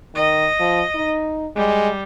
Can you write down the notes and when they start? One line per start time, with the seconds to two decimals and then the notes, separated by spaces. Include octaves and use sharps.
0.15 D#3 D#5
0.60 F3
0.95 D#4
1.56 G3 G#3